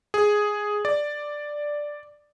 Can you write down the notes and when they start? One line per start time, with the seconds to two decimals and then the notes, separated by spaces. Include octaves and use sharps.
0.14 G#4
0.85 D5